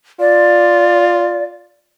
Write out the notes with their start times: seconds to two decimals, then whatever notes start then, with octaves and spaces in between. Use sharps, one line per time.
0.20 F4 D5